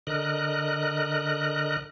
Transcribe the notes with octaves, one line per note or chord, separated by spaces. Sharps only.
D3 A#4 D#5 F#6